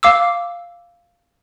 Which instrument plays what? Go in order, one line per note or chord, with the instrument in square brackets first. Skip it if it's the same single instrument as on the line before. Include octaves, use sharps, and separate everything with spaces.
[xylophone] F5 D6 E6